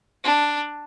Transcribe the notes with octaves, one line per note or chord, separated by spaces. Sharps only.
D4